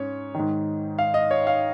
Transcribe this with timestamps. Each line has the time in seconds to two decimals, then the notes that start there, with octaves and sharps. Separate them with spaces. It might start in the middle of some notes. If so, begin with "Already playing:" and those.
Already playing: G#2 C#4 C#5
0.34 G#2 D#3
0.99 F5
1.14 D#5
1.31 C#5
1.47 F5